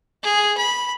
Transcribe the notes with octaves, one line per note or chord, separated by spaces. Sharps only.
G#4
B5